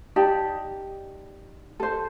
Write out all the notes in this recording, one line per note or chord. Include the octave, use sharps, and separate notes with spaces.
D#4 G4 D5 A5
A4 C5